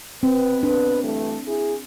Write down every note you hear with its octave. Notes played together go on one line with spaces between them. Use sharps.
B2 B3 C4 B4
D4
G2 E3 A3
E4 G#4